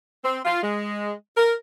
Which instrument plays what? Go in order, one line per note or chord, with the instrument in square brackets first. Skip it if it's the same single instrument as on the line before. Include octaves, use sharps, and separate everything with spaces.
[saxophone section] C4
F4
G#3
A#4